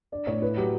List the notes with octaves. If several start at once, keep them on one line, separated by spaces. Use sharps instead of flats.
D4 D5
A2 C#5
E4 B4
F#3 G4